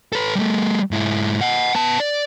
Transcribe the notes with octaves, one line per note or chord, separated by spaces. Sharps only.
A4 B4
G3 A3
G#2 E4
D#5 F#5
B3 A5
D5